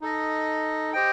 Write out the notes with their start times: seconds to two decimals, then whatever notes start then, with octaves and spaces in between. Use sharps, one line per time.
0.01 D#4 A4 D#5
0.93 G4 C5 D#5 G5